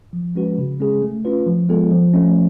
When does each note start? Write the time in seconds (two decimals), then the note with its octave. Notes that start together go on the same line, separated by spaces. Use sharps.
0.13 F3
0.36 G#3 C#4 F#4 B4
0.58 C#3
0.80 G#3 C#4 G#4
1.02 A3
1.25 C#4 F4 B4
1.47 F3
1.69 G#3 B3 F4 A4
1.91 F3
2.13 A3 C#4